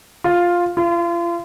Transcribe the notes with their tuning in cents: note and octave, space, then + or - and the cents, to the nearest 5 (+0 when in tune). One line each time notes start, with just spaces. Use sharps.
F4 +5
F4 -35